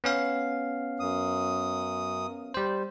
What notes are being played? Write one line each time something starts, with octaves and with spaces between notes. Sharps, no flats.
B3 C#4 F5
F#2 D#6
G3 C5